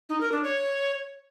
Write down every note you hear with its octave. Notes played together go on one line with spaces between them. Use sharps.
D#4
A#4
D4
C#5